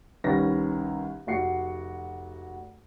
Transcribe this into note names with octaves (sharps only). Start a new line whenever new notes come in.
C2 D#3 C#4 F4 B4 A#6
F1 F#4 C7 C#7